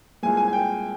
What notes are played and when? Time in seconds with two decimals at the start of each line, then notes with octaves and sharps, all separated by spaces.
0.23 C2 A#2 G#3 G#5
0.37 G#5
0.48 G#5
0.53 G5